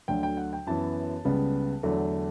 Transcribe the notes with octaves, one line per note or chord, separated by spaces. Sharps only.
D2 D3 F#3 G5
G5
F#5
G5
F#2 E3 B3 A5
C#2 C#3 G3 B3
E2 D3 F#3 A3